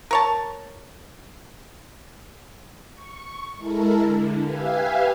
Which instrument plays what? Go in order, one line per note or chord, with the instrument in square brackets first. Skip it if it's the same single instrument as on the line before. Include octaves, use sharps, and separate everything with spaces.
[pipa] A#4 C#5 A5
[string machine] C#6
G#3 E4 A4 A#4
D3
G4 B4 E5 F5 G#5